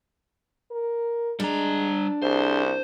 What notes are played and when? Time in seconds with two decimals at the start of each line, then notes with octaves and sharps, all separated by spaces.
0.71 A#4
1.40 G3 G#3 D4 A#5
2.22 C2 G#4 C5